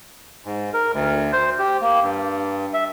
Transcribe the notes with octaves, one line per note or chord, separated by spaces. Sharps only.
G#2
A#4
D2
C5
G4
A#3
G2
E5